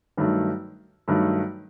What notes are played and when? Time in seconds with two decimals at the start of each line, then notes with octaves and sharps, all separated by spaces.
0.17 G2 D#3 F#3 A3
1.08 G2 D#3 F#3 A3